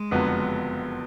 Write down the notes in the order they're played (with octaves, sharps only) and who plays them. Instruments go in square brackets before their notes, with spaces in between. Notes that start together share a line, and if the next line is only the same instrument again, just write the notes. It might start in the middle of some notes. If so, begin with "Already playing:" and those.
Already playing: [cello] G#3
[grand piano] F#1 F2 D3 F#3 B3